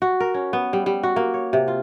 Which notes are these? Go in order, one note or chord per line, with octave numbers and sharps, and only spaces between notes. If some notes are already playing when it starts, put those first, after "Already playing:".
F#4
A#4
C#4
B3
G3
G3
F#4
A#3
C#5
C3
F4